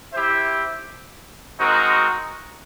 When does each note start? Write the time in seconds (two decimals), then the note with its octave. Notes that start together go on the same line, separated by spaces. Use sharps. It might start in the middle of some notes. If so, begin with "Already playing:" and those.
0.13 E4 G4 C5 E5
1.57 G#3 C4 D#4 F#4 A#4